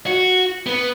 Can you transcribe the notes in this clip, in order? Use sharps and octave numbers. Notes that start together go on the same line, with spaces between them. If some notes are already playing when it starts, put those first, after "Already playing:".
F#4
B3